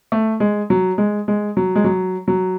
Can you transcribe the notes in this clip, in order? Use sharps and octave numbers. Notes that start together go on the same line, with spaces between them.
A3
G#3
F#3
G#3
G#3
F#3
G#3
F#3
F#3